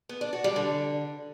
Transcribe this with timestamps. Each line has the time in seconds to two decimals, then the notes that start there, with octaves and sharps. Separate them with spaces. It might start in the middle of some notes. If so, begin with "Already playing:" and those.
0.09 B3
0.21 D4
0.33 F#4
0.44 G3
0.56 D3